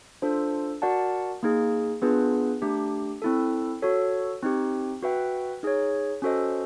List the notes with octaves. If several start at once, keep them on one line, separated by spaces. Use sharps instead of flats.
D4 F4 A4 C5
F#4 A#4 D5 F#5 A5
A#3 D#4 G#4
B3 D4 F4 G#4 B4
A3 D4 G4
C4 E4 A4
F#4 A4 C#5
C4 D#4 G4
F#4 B4 E5 G5
D#4 G#4 C#5
C#4 F#4 A4 C5 D#5